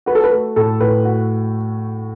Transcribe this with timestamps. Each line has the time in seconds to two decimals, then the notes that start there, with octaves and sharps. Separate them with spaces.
0.06 F#4 B4
0.15 A4
0.24 B4
0.31 A3
0.56 A2 A4
0.80 A2 B4
1.05 F#4